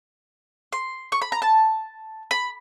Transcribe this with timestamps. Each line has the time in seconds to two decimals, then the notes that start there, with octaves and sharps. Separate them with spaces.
0.72 C6
1.12 C#6
1.22 B5
1.32 A#5
1.42 A5
2.31 B5